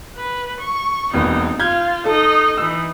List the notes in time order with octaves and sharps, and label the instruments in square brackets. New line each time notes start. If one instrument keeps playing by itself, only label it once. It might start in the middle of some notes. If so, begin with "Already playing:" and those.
[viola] B4
C#6
[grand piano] E1 A#3 B4 [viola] C4 D#4
[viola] F4 [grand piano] F6 G6 G#6
[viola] D#4 D#5 [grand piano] A4
[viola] E3 D#4 [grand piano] E6